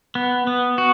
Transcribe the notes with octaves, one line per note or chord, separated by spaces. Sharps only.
B3
B3
F#4